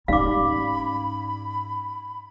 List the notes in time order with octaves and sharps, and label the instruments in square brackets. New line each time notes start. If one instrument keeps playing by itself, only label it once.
[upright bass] G#2 C#4 [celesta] D#4 G4 D5 [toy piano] F5 D6 [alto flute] B5